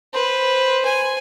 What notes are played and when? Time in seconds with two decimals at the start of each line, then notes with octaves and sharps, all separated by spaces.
0.14 B4 C5
0.85 G#5